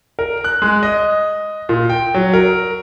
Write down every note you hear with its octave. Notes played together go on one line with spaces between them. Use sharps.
A#4
F#6
G#3
D#5
A#2
G5
F#3
A#4